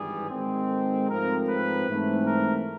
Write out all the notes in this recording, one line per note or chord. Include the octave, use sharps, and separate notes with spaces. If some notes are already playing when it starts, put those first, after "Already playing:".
Already playing: G#1 G2 E3 G3 G#4
G#1 G#2 D#3 G#3 C4
A4
G#2 F3 A3 C4 A#4
B4
G#2 E3 A3 C4
A#4